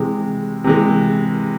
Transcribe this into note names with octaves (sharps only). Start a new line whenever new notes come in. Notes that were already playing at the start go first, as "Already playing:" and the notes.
Already playing: C3 E3 G#3
C3 E3 G#3